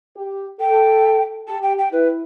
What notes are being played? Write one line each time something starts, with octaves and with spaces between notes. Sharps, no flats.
G4
A4 G5
G4 A5
G5
G5
E4 B4